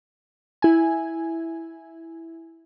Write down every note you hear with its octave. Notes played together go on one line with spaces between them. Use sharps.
E4 G#5